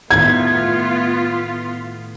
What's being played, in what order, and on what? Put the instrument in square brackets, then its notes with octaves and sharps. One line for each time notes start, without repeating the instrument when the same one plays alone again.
[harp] A2 D#3 A3 [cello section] B3 F4 [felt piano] G#6